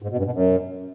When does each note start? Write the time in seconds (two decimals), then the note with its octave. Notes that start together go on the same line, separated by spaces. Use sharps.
0.02 G#2
0.10 B2
0.18 G2
0.25 B2
0.33 F#2